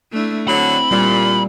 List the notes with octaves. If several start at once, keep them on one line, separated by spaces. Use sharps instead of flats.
A3 D4 E4
D3 F#3 C4 E4 B5
A#2 G3